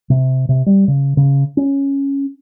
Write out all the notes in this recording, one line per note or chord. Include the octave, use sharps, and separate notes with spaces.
C3
C3
G3
C#3
C#3
C#4